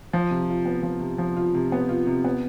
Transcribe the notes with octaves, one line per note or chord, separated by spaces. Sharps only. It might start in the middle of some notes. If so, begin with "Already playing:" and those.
F3
C3
F4
B3
F3
C3
F3
F4
C3
B3
F4
C3
B3